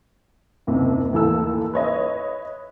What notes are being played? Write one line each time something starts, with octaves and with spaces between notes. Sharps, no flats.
F#1 D#2 C3
D#2 A2 E3 A4 E6
B4 C#5 D#5 E5